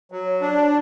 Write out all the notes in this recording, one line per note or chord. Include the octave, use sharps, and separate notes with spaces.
F#3
D4